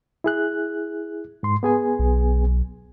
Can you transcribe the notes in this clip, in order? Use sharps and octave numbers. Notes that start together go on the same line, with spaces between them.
E4 G#4 F#6
G#2 C6
B3 G#4 G#5
B1